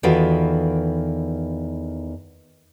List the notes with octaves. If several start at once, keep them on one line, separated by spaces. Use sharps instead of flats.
E2 D#3 F4 F#4 A4 B4